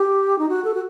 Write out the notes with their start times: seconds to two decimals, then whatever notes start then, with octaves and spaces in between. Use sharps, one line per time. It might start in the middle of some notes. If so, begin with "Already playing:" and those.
Already playing: G4
0.39 D#4
0.49 F#4
0.64 A4
0.74 F#4